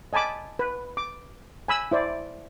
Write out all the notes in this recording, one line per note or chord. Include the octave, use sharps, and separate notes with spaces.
D#5 G#5 A5 B5 D6
B4
D6
G#5 B5 E6
E4 C5 D5